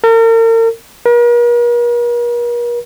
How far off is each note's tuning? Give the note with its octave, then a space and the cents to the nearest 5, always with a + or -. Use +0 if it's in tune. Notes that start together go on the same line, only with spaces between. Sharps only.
A#4 -40
A#4 +45